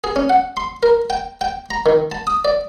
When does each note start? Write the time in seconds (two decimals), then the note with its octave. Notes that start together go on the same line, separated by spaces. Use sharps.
0.04 G#4
0.16 C#4
0.30 F#5
0.57 C6
0.83 A#4
1.10 G5
1.41 G5
1.71 A#5
1.86 D#3
2.12 A5
2.27 D#6
2.45 D5